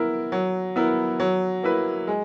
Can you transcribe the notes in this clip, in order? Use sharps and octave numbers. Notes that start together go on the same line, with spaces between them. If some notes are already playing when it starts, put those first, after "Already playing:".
Already playing: B3 E4 A#4
F#3
B3 E4 A#4
F#3
A#3 E4 B4
G#3